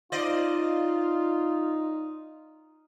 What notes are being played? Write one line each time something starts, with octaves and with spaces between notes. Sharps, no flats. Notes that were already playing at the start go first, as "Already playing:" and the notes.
D#4 F4 C5 D5 D#5